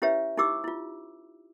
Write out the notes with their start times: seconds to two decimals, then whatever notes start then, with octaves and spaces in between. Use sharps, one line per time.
0.02 C#4 E4 G4 B4 C#5 E5
0.37 D#4 E4 G4 D6 E6
0.64 E4 F4